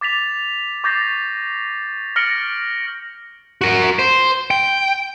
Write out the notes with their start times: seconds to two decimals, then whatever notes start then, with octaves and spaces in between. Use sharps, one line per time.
0.01 D6 A6 B6 F7
0.84 C#6 D6 G6 A6 A#6 C7
2.16 F6 A6 A#6 C#7 D7 F#7
3.61 F#4 A#4
3.99 C5
4.51 G5